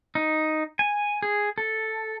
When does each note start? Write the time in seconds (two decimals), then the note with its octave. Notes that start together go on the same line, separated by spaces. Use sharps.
0.15 D#4
0.79 G#5
1.22 G#4
1.58 A4